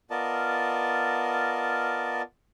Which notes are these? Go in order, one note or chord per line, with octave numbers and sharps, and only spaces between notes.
B3 F4 A#4 D5 D#5 A5